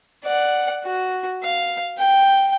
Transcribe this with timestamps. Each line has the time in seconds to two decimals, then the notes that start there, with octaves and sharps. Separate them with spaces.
0.25 D5 F#5
0.85 F#4
1.44 F5
1.98 G5